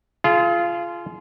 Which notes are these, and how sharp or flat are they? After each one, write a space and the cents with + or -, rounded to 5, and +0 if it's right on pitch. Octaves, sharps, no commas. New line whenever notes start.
F4 -15 G#4 +35